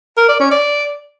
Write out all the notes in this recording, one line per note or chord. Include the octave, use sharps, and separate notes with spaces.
A#4
D5
C#4
D5